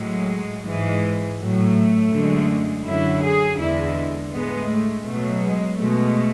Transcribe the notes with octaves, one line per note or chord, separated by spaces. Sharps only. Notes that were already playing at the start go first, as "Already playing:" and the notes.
Already playing: A2 F#3 G#3
G#2 E3 G#3
A2 F#3 A3
F#2 D3 G#3
F#2 D3 F#3 E4
G#4
E2 D3 G#3 E4
A2 G#3 B3
A3
B2 F#3 A3
G#3
B2 G#3 A3